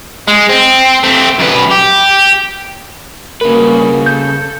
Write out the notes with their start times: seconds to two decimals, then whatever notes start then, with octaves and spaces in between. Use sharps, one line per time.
0.28 G#3
0.49 C4
1.03 A3 C4
1.40 F#2 B4
1.71 G4
3.41 C#3 G3 A#3 F#4 A#4 B4
4.06 A4 G6